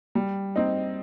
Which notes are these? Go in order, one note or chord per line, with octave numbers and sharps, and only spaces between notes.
G3
C4 D#4